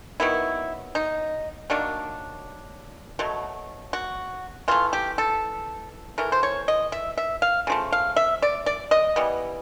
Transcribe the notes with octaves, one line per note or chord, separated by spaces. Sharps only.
D#3 F#3 B3 E4
D#4
D#3 F#3 A#3 D4
B2 F#3 A3
F#4
E3 A3 F4
G4
A4
E3 A3 A#4
C5
C#5
D#5
E5
E5
F5
C#3 F3 A3
F5
E5
D5
D5
D#5
E3 G3 B3